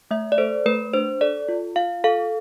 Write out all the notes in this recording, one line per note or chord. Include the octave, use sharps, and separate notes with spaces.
A3 E5
D5
A4 C5
A3 B4
D4 C5
A4 D5
F4
F4 F5
A4 F5